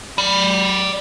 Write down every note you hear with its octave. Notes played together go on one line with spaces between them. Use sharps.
D5 B5